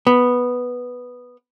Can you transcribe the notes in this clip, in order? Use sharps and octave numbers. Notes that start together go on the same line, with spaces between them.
B3